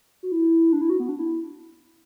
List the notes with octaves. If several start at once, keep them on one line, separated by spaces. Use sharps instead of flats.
F#4
E4
D4
E4
F#4
B3
D4
E4